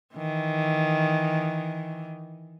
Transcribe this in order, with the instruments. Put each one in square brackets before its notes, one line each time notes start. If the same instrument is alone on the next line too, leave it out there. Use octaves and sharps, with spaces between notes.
[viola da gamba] D#3 E3